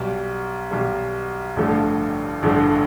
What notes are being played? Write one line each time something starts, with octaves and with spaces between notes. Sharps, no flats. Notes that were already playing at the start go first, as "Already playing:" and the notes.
Already playing: B1 B2 G3
B1 B2 G3
A1 G2 D3 F3 A3
A1 G2 D3 F3 A3